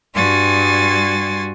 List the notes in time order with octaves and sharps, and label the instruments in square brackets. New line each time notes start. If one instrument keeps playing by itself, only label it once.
[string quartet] G2 G3 F#4 G#5 C6 A6